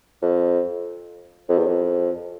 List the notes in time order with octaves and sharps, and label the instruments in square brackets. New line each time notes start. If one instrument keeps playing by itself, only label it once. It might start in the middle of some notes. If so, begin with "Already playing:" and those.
[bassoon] F2
F2
E2
F2